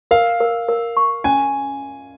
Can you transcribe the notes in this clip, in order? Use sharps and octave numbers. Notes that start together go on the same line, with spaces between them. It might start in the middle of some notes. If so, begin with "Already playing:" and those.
A#4 F5
A#4
A#4
C#6
C#4 G#5